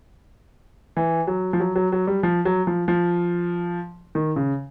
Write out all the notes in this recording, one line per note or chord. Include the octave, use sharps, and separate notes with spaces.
E3
F#3
F3
F#3
F#3
F#3
G3
F3
F#3
F3
F3
D#3
C#3